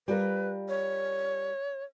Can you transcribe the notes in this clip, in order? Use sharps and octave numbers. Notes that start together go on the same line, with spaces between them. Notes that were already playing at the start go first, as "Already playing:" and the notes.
G3 F4 A#4 B4
C#5